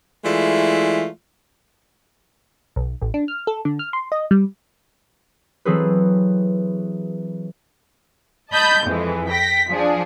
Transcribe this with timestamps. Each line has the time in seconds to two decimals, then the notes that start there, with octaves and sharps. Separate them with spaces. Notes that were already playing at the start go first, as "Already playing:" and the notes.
0.24 E3 G#3 A3 E4 F4 D5
2.76 B1
3.02 A1
3.14 D4
3.28 F6
3.47 A4
3.65 D3
3.79 F6
3.93 C6
4.12 D#5
4.31 G3
5.65 E3 F#3 C4 G#4 A4 B4
8.52 D#5 A5 B5 G6
8.86 F2 E3 G#3
9.30 G5 A#6 B6
9.70 F3 D4 G#4